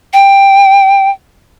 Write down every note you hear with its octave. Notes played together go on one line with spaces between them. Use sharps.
G5